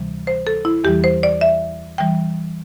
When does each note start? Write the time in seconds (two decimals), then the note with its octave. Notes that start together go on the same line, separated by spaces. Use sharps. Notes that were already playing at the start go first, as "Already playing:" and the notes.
Already playing: D2 C3 E3 G3
0.27 C5
0.47 A4
0.65 E4
0.84 E2 E3 G3 G4
1.04 C5
1.23 D5
1.41 E5
1.98 E3 G3 G5